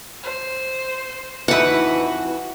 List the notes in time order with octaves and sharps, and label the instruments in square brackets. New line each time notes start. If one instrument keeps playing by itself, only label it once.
[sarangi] C5
[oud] F2 D#4 E4 [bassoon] E3 [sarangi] F#4 [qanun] B4 F#5